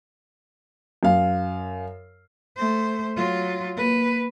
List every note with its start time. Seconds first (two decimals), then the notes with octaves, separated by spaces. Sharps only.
1.03 F#2 F5
2.57 A3 C5
3.17 F#3 F4
3.76 A#3 B4